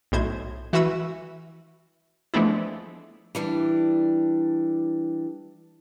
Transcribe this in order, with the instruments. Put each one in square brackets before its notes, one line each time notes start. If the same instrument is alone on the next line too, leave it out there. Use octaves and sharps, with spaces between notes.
[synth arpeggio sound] B1 A2 C5 G#6
E3 F#4 E5 B5 E6 D#7
F3 G#3 A3 B3 D4 E4
[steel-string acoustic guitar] E3 G3 D4